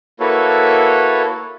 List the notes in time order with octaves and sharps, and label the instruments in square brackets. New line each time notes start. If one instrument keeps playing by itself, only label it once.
[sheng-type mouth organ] A#3 E4 F#4 A4 B4 C#5